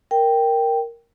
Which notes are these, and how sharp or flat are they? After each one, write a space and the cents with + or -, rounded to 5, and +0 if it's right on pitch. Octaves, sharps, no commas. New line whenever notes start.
A#4 +0 G5 +0